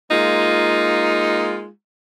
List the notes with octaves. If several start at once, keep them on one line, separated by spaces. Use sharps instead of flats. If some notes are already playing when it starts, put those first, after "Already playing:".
G#3 A#3 D#4 F4